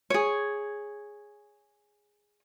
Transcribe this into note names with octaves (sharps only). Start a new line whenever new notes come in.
G#4 C#5